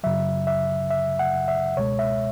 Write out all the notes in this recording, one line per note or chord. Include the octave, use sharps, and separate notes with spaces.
F#2 C#3 F#3 E5
E5
E5
F#5
E5
C#2 B2 G#3 C#5
E5